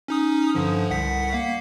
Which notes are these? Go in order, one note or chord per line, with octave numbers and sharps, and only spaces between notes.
C#4 D#4 D#6
G2 D3 F3
C2 F#5 B6
A#3 F5